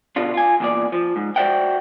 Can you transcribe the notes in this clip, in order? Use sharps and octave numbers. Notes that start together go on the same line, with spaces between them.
B2 D3 D4 F4
F4 G#5
E2 A#2 D5
F3
G#2
F#4 C5 D5 E5 F#5 G5